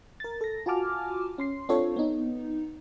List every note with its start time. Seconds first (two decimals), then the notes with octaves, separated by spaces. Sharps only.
0.20 A#4 A6
0.41 A4 A#6
0.66 F4 F#4 G#5 A5 D6 F6
1.38 C#4 C6 C7
1.69 C4 D4 F4 A4 C5 C#5
1.96 B3 D#4